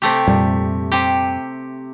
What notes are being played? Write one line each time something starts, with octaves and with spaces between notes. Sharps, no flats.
C3 A3 G4
F2 A#2 G3
C3 G4